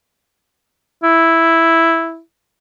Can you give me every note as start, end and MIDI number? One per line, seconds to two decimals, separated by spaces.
1.04 2.20 64